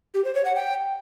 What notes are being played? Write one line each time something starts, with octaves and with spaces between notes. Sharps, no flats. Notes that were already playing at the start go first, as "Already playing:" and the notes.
G4
C5
C#5
F#5
G5